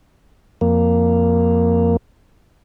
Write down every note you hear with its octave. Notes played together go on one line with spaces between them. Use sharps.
F2 A#3